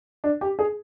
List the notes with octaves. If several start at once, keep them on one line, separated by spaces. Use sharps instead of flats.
D4
G4
G#4